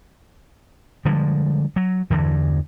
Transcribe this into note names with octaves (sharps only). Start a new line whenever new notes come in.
D3 F3 G3 G#3
F#3
E2 G2 D3 E3